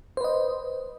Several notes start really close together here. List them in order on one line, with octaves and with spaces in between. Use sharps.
C5 B4 D#5